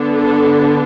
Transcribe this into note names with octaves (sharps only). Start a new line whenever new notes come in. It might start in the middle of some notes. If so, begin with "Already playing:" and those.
Already playing: D3 B3 D4
A4